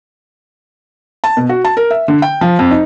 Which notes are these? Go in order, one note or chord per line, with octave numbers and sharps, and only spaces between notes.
A5
B2
F#4
A5
A#4
E5
D3
G5
F3
F2
D#4